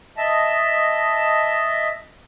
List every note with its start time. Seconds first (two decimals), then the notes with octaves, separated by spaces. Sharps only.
0.17 D#5 E5 A5